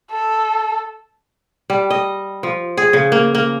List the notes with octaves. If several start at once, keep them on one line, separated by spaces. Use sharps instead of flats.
A4
G3
D#5
F3
G#4
C#3
A#3
A#3